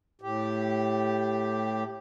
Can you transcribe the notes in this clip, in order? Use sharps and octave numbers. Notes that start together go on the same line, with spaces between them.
A2 G4